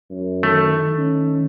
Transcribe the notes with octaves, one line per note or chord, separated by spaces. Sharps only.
F#2
D#3 A3
C#4